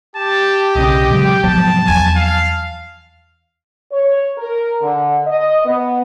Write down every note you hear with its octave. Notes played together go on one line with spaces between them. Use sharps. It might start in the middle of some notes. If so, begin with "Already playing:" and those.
G4 A5
B1 C#3 D#5
C#3 F#3 G#3 G5
G#2 C3 F3 F#3 B3 A5
E2 C4 G#5
F5
C#5
A#4
D3
D#5
B3